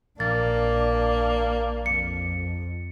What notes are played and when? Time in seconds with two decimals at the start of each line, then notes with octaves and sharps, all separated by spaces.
0.20 A#1 A#3 D4 A6
1.86 F2 C#7